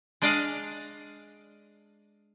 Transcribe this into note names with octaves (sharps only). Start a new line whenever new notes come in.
G#3 D4 D5 D#5 F5